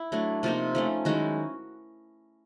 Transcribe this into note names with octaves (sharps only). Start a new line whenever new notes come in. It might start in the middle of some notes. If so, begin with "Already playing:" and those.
Already playing: E4
F#3 A3 D4
C3 F3 A#3 D#4 F4
F3 A3 C#4
D#3 F#3 G#3 C#4 E4 F#4